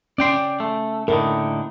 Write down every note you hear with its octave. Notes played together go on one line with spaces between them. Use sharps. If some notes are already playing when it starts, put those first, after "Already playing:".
C#4 D5 G5 C6
A3
A2 D3 D#4 A#4